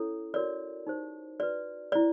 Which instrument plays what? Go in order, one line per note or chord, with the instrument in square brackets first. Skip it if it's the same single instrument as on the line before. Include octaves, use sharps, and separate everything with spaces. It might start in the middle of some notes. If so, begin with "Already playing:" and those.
Already playing: [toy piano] C#4 E4 A4 C#5
F#4 A#4 C#5 D5
D#4 G4 C5
F#4 B4 D5
E4 G4 C5 D5